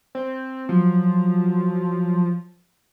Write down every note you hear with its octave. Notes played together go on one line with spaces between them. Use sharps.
C4
F3 F#3